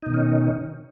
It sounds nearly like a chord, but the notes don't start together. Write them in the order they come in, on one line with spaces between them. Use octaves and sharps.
D#4 B2 D#3 C#4